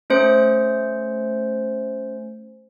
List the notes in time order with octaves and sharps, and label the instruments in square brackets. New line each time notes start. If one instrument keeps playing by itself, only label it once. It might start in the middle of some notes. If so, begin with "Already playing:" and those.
[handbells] A3 C#4 C5 C#7